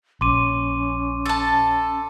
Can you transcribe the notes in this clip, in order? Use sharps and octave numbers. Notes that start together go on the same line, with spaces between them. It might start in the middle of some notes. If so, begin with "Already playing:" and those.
A#1 C#4 C6 D6 D#7
A4 A5